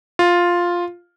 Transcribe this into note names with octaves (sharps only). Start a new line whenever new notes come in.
F4